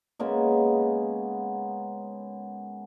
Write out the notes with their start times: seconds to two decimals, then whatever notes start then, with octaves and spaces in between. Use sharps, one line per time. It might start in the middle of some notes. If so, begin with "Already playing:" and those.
0.19 C#3 G#3 A#3 B3